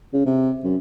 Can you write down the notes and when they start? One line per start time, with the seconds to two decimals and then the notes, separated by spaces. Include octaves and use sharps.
0.13 C#3
0.26 C3
0.64 F#2